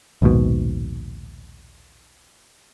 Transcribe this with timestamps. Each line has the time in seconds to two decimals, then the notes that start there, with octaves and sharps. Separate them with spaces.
0.22 A#1 D#2 G#2 B2